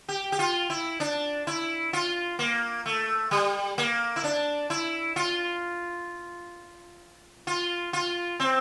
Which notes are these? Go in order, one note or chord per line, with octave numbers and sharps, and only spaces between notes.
G4
G4
F4
E4
D4
E4
F4
A#3
A3
G3
A#3
E4
D4
E4
F4
F4
F4
C4